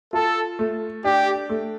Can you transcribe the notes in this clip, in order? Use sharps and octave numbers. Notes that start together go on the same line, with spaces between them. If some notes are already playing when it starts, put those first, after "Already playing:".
F4 A4
A3
D4 G4
A3